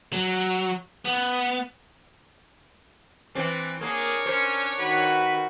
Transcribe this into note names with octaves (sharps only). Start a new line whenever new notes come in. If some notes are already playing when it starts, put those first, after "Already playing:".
F#3
B3
E3 C4 D4
A#3 D4 G#4 A#4 C#5
C#4 C5
D#3 F#4 B4